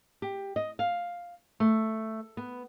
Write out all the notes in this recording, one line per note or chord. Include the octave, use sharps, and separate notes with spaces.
G4
D#5
F5
A3
B3